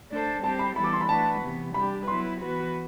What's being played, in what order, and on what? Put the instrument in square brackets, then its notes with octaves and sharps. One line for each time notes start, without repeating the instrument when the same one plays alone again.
[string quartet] A3 D4 A4 C5
[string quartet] G3 C4 G4 C5 [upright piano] A5
[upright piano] B5
[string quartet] E3 G3 B3 E4 A4 [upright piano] B5
[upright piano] D6
C6
B5
[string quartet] A3 D4 F#4 B4 [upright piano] A5
[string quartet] C3 E3 B3
[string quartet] G3 D4 G4 [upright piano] B5
[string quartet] F#3 B3 E4 B4 [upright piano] C6
[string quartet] E3 B3 F#4 B4